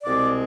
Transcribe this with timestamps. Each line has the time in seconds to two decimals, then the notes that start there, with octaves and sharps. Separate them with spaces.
0.03 C2 B2 G#3 C4 D5